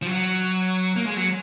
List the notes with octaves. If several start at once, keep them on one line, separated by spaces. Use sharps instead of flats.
F3
F#3
A#3
G#3
F#3